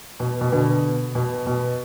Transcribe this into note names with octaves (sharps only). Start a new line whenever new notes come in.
B2
B2
B2 D3
B2
B2